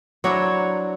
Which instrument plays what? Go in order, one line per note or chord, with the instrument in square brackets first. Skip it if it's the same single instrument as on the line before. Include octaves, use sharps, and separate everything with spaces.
[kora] F#3 D4 E4 [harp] C5 C#5 A#5